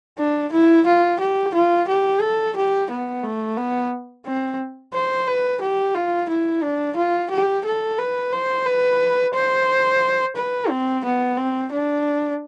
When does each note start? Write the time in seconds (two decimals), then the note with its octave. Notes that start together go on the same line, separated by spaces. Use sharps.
0.19 D4
0.53 E4
0.87 F4
1.20 G4
1.54 F4
1.88 G4
2.22 A4
2.56 G4
2.91 B3
3.24 A3
3.57 B3
4.26 C4
4.94 C5
5.28 B4
5.62 G4
5.95 F4
6.29 E4
6.63 D4
6.97 F4
7.31 G4
7.65 A4
7.99 B4
8.32 C5
8.66 B4
9.34 C5
10.36 B4
10.70 C4
11.04 B3
11.37 C4
11.72 D4